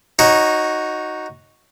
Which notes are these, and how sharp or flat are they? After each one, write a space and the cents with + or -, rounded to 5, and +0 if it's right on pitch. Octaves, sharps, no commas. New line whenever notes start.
D#4 +0 F#4 +0 C#5 -25